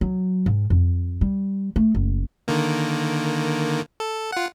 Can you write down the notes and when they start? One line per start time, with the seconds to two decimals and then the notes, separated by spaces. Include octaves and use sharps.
0.01 F#3
0.46 G#2
0.70 F2
1.21 G3
1.76 A3
1.95 F#1
2.48 D3 D#3 A#3
4.00 A4
4.32 F4 F#5